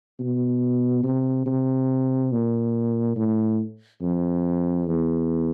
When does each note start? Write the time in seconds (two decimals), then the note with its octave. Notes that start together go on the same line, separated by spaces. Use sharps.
0.20 B2
1.03 C3
1.46 C3
2.32 A#2
3.16 A2
4.02 F2
4.87 E2